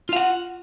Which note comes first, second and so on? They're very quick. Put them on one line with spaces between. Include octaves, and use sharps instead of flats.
F4 F5 F#5